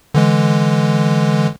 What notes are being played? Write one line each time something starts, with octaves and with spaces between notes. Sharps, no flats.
D3 E3 G#3